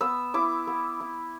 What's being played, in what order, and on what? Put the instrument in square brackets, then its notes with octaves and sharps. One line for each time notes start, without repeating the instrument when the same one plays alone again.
[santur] B3 E6
E4 D6
B3
E4